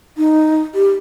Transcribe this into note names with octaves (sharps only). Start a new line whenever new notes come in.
D#4
G4